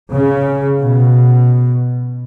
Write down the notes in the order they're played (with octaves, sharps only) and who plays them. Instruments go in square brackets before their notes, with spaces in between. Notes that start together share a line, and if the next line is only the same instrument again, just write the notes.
[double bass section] C#3
B2